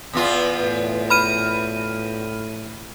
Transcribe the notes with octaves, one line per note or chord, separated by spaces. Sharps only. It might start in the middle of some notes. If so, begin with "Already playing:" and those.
E2 B3 F4
A2
B5 F6 D#7